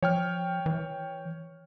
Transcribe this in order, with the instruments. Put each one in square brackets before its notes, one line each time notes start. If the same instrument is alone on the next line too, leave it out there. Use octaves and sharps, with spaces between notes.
[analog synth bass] F3 [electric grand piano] C#5 G5 F6
[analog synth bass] E3